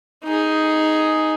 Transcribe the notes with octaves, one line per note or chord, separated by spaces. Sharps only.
D#4 G#4